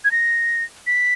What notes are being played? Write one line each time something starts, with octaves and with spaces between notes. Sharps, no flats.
G#6
A#6
B6